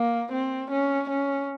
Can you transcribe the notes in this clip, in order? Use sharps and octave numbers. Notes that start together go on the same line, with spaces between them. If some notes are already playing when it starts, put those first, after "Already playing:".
Already playing: A#3
C4
C#4
C#4